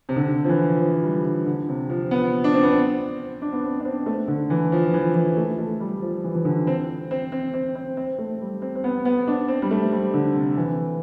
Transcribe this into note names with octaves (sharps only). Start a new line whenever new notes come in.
C3
D3
F3
E3
F3
G3
D3
D3
C3
F3
B3
D4
C4
B3
C4
D4
B3
C4
D4
C4
A3
D3
E3
F3
E3
E3
A3
A3
G3
F3
E3
E3
D3
C4
C4
C4
C4
C4
C4
A3
G3
C4
C4
B3
B3
D4
C4
G3
A3
G3
D3
C3
E3